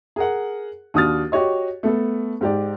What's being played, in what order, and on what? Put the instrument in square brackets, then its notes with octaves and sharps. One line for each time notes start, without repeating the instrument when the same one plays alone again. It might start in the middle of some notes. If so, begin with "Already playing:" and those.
[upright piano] G#4 A#4 F#5
D#2 D4 F#4 D#6 F6 A6
F#4 G4 C#5 D#5
A3 B3 A4
G#2 G4 D5